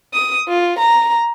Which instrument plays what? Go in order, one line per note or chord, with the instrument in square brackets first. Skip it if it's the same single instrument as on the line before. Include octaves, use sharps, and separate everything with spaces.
[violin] D#6
F4
A#5